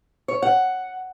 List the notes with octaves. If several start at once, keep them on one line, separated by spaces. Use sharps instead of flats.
C#5
F#5